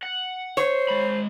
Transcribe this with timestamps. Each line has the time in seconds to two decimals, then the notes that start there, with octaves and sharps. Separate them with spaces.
0.03 F#5
0.57 C5 C#5
0.88 G#3 B5